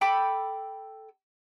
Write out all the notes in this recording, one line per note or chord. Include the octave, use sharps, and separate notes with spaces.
A4 G5 B5 D6